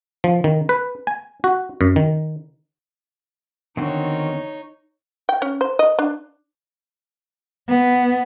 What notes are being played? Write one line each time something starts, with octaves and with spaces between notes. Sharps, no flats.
F3
D#3
B4
G#5
F#4
F#2
D#3
E2 D3 D#3 C4 D#4 F#4 C#5
G5
C#4
C5
D#5
D4
B3